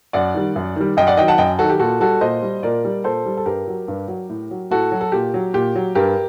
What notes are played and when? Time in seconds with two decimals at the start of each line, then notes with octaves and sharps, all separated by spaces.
0.13 F#2 D5 F#5
0.34 D#3 G3
0.56 F#2
0.76 D#3 G3
0.97 F#2 D#5 G5
1.07 D5 F#5
1.17 D#3 F#3 D#5 G5
1.28 F#5 A5
1.38 F#2 D#5 G5
1.59 D#3 F#3 F#4 A4
1.70 G4
1.80 A#2 F#4 A4
2.00 G3 F#4 A4
2.21 A#2 C5 D#5
2.43 G3
2.63 A#2 A#4 D5
2.85 G3
3.04 A#2 A4 C5
3.26 G3
3.37 A4
3.46 G2 G4 A#4
3.67 F#3
3.88 G2
4.08 F#3
4.29 A2
4.51 F#3
4.71 A2 F#4 A4
4.92 F#3
5.01 A4
5.12 A#2 G4
5.34 F#3
5.54 A#2 G4
5.75 F#3
5.95 G2 G4 A#4